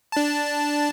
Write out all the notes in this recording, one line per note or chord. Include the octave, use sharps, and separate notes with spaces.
D4 A5